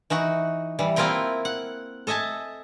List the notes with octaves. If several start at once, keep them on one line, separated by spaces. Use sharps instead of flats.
E3 D#4 F#4
E3 G3
A#3 C4 E4 F4 A#4 G5
F#5
A4 D#5 E5 G#5 A5